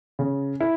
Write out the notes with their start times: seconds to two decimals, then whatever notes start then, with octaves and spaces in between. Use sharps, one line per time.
0.19 C#3
0.61 E4